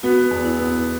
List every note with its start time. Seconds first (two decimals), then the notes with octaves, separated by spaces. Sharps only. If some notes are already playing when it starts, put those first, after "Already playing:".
0.03 B3 F#4
0.31 E2
0.45 E4
0.59 B3